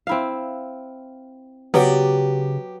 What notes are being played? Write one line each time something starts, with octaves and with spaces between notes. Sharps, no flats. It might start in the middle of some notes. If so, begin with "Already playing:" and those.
C4 E4 F5
C#3 F#3 B3 F#4 G4 D5